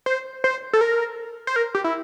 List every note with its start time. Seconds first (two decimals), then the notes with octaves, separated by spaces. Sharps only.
0.06 C5
0.44 C5
0.73 A4
0.81 A#4
1.47 C5
1.56 A#4
1.75 G4
1.84 E4